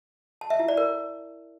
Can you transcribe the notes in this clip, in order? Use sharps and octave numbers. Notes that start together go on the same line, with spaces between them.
A5
E5
E4
D5
A#4